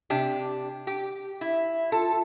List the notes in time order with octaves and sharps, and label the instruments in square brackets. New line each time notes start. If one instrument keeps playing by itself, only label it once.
[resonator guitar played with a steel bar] C3 D4 G4
G4
[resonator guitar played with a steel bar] E4 [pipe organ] E5
[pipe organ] F4 A5 [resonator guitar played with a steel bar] A4